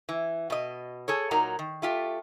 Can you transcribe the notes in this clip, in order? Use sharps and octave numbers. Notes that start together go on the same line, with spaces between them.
E3
B2 D#5
G#4 A4 C#5
A#2 F#3 D#4 A#4 A#5
D#3
A3 F4 G4